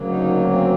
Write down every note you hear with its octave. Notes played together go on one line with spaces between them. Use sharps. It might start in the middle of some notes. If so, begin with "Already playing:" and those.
Already playing: D2 C#3 F#3 A#3
D#4
C4